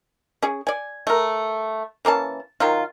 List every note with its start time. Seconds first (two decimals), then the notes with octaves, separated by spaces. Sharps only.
0.42 C#4 G#4
0.67 D5 G#5
1.07 A3 A#4
2.05 E3 A#3 C#4 A5
2.60 D#3 F#3 F4